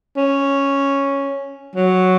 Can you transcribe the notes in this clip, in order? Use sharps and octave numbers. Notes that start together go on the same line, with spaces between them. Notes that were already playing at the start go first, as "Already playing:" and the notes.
C#4
F#3